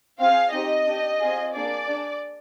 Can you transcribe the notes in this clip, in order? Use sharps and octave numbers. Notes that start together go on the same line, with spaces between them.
C4 F4 G#4 F5
C4 D#4 G4 D#5
D4 G4
C4 F4 G#4
A#3 D4 G#4 D5
D4 G#4